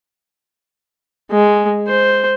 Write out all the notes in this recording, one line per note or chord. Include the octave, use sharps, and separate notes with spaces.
G#3
C5